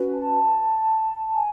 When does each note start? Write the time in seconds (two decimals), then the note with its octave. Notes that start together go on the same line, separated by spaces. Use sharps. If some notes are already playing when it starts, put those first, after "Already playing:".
Already playing: C#4 F#4 B4
0.14 A5
1.35 G#5